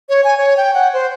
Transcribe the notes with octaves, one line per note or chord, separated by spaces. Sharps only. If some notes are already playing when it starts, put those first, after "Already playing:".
C#5
G#5
C#5
G5
F#5
C5